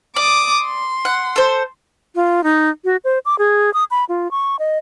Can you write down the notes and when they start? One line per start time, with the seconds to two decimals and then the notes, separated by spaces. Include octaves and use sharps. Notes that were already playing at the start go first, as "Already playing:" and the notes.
0.16 D5 D6 D#6
0.64 C6
1.05 F#5
1.36 A4 C5
2.15 F4
2.44 D#4
2.85 F#4
3.04 C5
3.25 D6
3.39 G#4
3.74 D#6
3.91 B5
4.09 F4
4.31 C#6
4.59 D#5